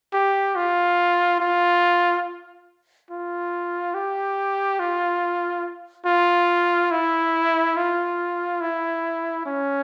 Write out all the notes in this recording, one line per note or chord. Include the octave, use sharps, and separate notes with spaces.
G4
F4
F4
F4
G4
F4
F4
E4
F4
E4
C#4